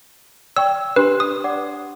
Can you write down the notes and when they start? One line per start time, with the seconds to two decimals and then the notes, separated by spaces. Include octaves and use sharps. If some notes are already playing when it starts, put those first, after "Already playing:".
0.56 D5 G5 C#6 E6
0.96 D4 G4 B4 C6
1.20 D#6
1.44 D5 F#5 D6